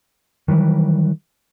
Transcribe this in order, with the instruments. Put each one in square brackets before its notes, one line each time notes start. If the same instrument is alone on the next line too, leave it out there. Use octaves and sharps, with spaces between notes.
[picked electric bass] D#3 E3 F#3 G3